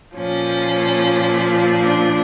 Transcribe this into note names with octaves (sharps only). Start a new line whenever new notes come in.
A#2 F3 C#4
D4